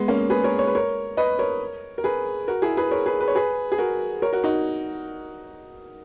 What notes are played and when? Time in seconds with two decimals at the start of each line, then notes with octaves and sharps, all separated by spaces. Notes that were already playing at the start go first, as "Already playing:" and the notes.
Already playing: G#3 B3
0.08 A#3 C#4
0.30 G#4 B4
0.44 A#4 C#5
0.59 C#5
0.67 B4
0.75 A#4 C#5
1.17 B4 D#5
1.39 A#4 C#5
1.98 A#4
2.04 G#4 B4
2.48 F#4 A#4
2.62 E4 G#4
2.77 G#4 B4
2.91 A#4 C#5
3.06 G#4 B4
3.20 B4
3.28 C#5
3.35 G#4 B4
3.72 G#4
3.78 F#4 A#4
4.22 A#4 C#5
4.33 F#4 A#4
4.44 D#4 F#4